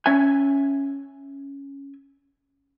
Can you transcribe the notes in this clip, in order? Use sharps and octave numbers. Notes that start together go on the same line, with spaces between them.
C#4 E5 G#5